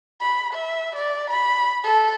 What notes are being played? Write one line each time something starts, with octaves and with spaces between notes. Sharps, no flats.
B5
E5
D5
B5
A4